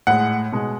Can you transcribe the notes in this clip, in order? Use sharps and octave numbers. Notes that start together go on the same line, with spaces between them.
A2 G#3 F#5
B2 G#3